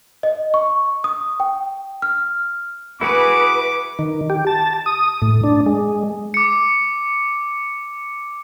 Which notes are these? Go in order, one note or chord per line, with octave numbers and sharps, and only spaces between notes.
D#5
C#6
D#6
G5
F6
E4 F#4 G#4 B4 D6
D#3
G4
A5
D#6
A2
D4
G#3
D6 C#7